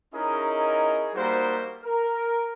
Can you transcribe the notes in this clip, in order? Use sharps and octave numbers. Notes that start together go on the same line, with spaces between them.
C#4 D#4 E4 G#4 A#4 D#5
G3 A#3 D#4 F#4 C5
A#4